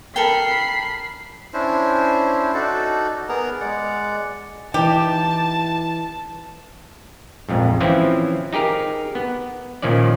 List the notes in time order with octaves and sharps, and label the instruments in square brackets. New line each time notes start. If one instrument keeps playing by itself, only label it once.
[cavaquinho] A4 A#4 G5 [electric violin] B5 C7
[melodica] C#4 D4 E4 C5
D#4 F#4 A4 D5
B3 G#4 A#4 A#5
G#3 D5 F#5
[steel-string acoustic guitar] E3 D#4 [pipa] G4 [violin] A5
[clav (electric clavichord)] A#1 F2 G#2
E3 F3 C4 C#4 E4 F4
D#4 G4 G#4 A#4
B3
A#2 D#3 F3 C#4 D5